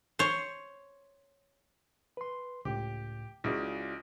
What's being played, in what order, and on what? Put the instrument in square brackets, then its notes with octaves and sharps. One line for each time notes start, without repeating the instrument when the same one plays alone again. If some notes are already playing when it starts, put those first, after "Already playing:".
[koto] C5 C#5
[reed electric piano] B4 C6
[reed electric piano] C#2 A2 [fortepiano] G4
[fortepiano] C#2 C#3 [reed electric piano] E4 F#4 D5